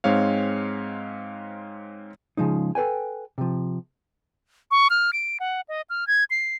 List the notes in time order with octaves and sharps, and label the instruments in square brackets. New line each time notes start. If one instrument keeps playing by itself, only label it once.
[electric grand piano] G#2 G#3 C4 C#5 F5
[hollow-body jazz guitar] C#3 F3 G#3 D#4
A4 B4 G5 G#5
C3 F3
[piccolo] C#6
F6
D7
F#5
D#5
F6
G#6
C7